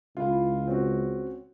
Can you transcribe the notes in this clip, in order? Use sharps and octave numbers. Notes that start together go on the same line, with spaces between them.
C#2 E4 F4
C4 C#4 F#4